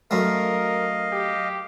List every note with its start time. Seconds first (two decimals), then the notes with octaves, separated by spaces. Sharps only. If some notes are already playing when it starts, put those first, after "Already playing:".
0.11 F#2 A3 A#4 D#5 F5
1.12 G4